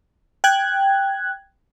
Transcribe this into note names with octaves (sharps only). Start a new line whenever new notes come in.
G5 F#6 G#6